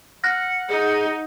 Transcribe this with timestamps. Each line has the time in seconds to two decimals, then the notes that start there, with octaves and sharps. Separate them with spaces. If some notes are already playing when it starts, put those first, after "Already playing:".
0.24 F#5 F6 F#6 A#6
0.69 D#4 G#4